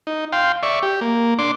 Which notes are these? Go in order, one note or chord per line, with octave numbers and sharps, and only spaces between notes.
D#4
F5 G5 C6
D5 E5 C#6
G4
A#3
D4 C6 D6